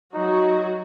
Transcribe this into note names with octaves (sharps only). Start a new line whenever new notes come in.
F#3 D#4 F#4